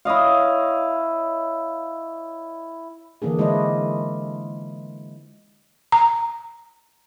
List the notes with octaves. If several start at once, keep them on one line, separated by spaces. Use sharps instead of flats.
E4 C#5 D#5 F5
D3 E3 A#3 D4 G#4
G#3 D4 E4 F4 C5 D#5
A#5